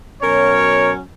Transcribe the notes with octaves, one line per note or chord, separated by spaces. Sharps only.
B2 F#3 C#4 A#4 C#5